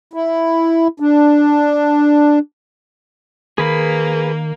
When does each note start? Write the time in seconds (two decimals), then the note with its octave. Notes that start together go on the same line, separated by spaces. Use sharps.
0.13 E4
1.00 D4
3.58 D#3 A#3 G#4 B4 B5